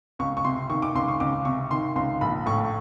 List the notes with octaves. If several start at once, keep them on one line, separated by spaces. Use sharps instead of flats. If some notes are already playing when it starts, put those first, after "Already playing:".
C#2 C#6
C#6
C3 C6
D#3 C#6
D6
C#2 C6
C#6
C#2 D6
C3 C#6
D#3 C6
C#2 C6
A#1 B5
A2 C#6